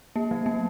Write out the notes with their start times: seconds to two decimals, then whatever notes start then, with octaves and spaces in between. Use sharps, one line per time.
0.16 A#3
0.31 F#3
0.46 A#3